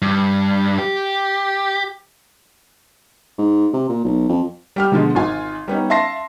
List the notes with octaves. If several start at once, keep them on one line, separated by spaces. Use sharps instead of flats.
G2
G4
G#2
C3
A#2
B1
F2
G3 G4 F6
B2 D3 F3 G#3
G#1 D#3 F4 G#5
G3 B3 C#4 D#4
E5 F5 A5 C6 A#6 C7